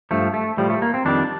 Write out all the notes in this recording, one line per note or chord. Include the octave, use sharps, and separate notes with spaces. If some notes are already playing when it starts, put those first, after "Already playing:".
G2 F3 A3
A3
A2 F3 G3
A3
A#3
C4
F2 D#3 G3 D4